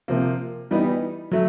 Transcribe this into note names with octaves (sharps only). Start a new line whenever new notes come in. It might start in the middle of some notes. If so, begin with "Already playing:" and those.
C3 F3 A#3
E3 G3 B3 D#4
F#3 A3